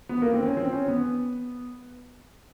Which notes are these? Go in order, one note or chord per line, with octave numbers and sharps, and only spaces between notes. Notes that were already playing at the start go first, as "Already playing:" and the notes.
B3
A#3
C4
C#4
C4
C#4
B3